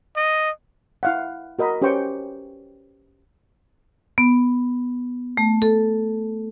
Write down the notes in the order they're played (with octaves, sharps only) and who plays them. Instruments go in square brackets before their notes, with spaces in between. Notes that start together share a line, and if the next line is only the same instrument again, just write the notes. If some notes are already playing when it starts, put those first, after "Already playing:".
[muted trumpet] D#5
[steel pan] E4 F5 F#5
F#4 A#4 D#5 B5
C#4 G4 B4 C5 G5 C#6
[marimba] B3
A3
A4